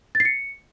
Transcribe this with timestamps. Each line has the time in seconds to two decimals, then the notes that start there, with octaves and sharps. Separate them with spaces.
0.15 A6
0.20 C7
0.25 C#7